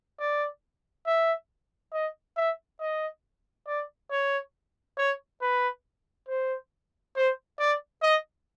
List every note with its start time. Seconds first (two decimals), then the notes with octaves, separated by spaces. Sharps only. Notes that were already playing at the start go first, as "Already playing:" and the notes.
0.20 D5
1.07 E5
1.93 D#5
2.37 E5
2.80 D#5
3.67 D5
4.11 C#5
4.98 C#5
5.42 B4
6.28 C5
7.16 C5
7.59 D5
8.02 D#5